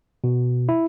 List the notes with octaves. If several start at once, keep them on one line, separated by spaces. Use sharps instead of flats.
B2
E4